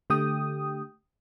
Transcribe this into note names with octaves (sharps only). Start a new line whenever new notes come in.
D3 A3 G4 G5 D#6